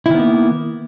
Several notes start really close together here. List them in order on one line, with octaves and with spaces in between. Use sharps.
E4 D#3 B3 A#3